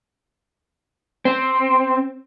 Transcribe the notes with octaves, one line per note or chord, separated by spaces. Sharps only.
C4